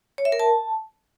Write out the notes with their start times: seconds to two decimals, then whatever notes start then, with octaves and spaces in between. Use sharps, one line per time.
0.18 C#5
0.25 E5
0.32 A#4
0.39 A5